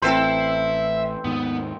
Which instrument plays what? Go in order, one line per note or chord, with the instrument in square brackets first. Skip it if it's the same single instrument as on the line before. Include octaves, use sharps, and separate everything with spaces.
[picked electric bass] A1 [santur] C4 C5 [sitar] A4 B4 [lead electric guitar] E5 B5
[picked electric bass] D#2 G#2 D#3 [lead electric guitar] B3